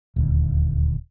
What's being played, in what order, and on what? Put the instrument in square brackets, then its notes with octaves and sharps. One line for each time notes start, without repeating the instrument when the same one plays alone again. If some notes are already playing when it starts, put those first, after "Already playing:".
[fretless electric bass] D#1 D2